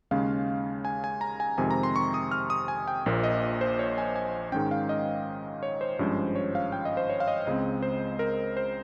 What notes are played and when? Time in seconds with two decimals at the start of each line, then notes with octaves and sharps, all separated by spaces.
0.11 D#2 C#3 G#3 C#4 F5
0.85 G#5
1.04 G#5
1.21 A#5
1.40 G#5
1.58 F2 C3 D#3 G#3 C4 G#5
1.71 A#5
1.83 C6
1.96 C#6
2.14 D#6
2.32 F6
2.50 D#6
2.68 G#5
2.88 G5
3.06 A#1 A#2 F3 A#3
3.23 D#5
3.61 C5
3.79 C#5
3.98 G#5
4.16 G#5
4.52 G#2 D#3 G#3 C#4 G5
4.71 F5
4.89 D#5
5.63 C#5
5.81 C5
5.99 G#1 G2 F3 G#3 C#4
6.36 C#5
6.55 F5
6.72 G5
6.85 D#5
6.97 C5
7.10 C#5
7.20 F5
7.28 D#5
7.47 C#2 C#3 G#3 C4 D#5
7.83 C5
8.19 A#4
8.57 C5